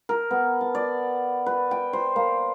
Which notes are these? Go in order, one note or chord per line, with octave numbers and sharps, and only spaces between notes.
A#4
B3
A5
D5
B4
G5
C5
A#3